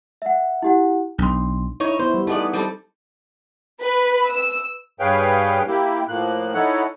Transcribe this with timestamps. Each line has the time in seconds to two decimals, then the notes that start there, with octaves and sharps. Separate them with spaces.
0.22 E5 F#5
0.63 E4 G4 F#5
1.18 B1 D4 C6
1.80 D#4 E4 C#5
1.99 B3 E4 C5
2.14 G3
2.27 A3 B3 D#4 G#4 D5
2.53 G3 C4 A4
3.81 B4
4.28 E6
5.00 G2 G#4 B4 C#5 F5 G5
5.67 A#3 E4 G4
6.08 A2 F3 A#3 F#6
6.54 D#4 E4 A4 C#5 F#5